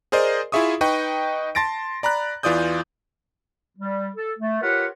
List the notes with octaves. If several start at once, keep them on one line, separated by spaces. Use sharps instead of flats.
G#4 A#4 C5 D5 D#5
E4 F4 G#4 E5 C#6 D#6
D#4 B4 D#5 G5 C#6
A5 C6 A6 A#6 D7
D5 A#5 B5 F#6
E2 E3 F4 D5 D#6 G6
G3
A4
A3
F4 G4 A#4 B4 C#5 F#5